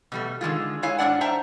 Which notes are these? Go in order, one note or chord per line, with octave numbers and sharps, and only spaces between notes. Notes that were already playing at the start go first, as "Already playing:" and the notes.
B2 G3 A3
D3 D#3 G#3 F4
G#3 E4 C#5 F5 G#5
G#2 G#3 D4 D5 F#5
C5 E5 G5 A5 A#5